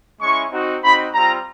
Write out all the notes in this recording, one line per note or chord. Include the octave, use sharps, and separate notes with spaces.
G#3 C#4 E4 C#6
C4 D#4 F#4
C4 D#4 F#4 B5
G3 C4 F4 A#5